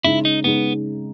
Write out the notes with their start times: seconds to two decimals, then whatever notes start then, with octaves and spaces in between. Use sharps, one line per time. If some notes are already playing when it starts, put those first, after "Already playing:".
0.04 C#3 G#3 D#4 E4
0.25 D#4
0.44 C#3 G#3 B3 D#4